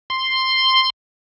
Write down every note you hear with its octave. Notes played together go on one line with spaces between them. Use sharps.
C6